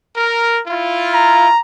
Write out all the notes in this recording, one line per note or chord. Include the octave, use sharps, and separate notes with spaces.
A#4
E4 F4
A#5